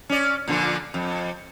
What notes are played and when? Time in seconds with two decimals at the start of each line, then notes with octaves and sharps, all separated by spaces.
0.10 C#4 D5
0.48 A#2 D3 F3
0.94 F2